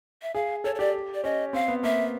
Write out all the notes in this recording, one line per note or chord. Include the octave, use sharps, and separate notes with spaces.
E5
G#4 F5
A4 C#5
C#5
G4 D5
D5
C#4 D#5
C4 F5
B3
A#3 E5